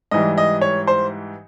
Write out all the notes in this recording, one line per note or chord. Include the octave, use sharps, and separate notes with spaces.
G#2 E3 G3 D#5
D#5
C#5
C5